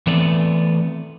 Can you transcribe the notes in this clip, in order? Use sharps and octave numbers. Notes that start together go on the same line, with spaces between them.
E3 A3 B3 C4 D5